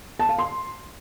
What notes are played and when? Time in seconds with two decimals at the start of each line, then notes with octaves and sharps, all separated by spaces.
0.19 A5
0.29 F5
0.38 C6